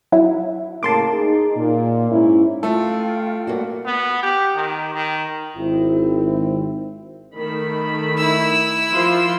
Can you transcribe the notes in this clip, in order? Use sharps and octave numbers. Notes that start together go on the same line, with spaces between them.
F#3 E4
A2 C#3 A#3 A5 C6 D6
D#4 G#4
A#2
G#2 C#4 E4
A3 F4 A4 G5
G2 A#3 F#4
B3
G4
D#3
D#3
G#1 C4 E4
D#3 A3 B5
E4 E6
F3 F4 C6